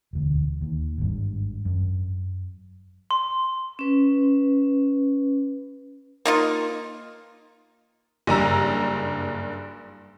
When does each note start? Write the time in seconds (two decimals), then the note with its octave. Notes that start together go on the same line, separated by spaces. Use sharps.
0.13 E1 D2
0.61 D#2
0.98 G#1 G2
1.65 F#2
3.11 C6
3.79 C#4 B4
6.25 A#3 D#4 F4
8.27 F#1 G2 A#5 E6